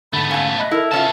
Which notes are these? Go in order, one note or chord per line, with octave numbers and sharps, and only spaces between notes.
G#2 D3 A3 B3 B5
C#4 F5 A5
D#5 E5 B5 F#6
E4 A4 A#4
C#3 B3 C#4 F4 E5 A5